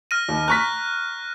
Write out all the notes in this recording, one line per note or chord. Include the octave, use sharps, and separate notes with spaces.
F6 A#6 D#7
D#2
A#5 C#6 F#6 A#6 B6